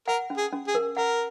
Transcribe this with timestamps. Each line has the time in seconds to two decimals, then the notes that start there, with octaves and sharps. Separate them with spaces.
0.08 A#4 F#5
0.30 C#4
0.37 G#4
0.53 C#4
0.67 G#4
0.75 A#4
0.97 A#4 F#5